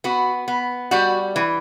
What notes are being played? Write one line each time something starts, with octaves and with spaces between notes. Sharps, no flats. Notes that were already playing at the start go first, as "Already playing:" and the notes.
B3 F#4
B3
G3 F#4
E3